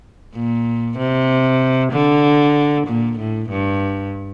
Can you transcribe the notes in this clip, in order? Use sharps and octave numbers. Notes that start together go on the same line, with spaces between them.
A#2
C3
D3
A#2
A2
G2